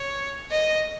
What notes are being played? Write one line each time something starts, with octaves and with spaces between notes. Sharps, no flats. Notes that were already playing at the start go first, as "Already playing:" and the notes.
Already playing: C#5
D#5